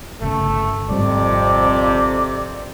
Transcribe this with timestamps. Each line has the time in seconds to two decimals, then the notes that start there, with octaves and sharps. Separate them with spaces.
0.22 G1 C#3 A3
0.89 G#1 F2 C3 G3 D5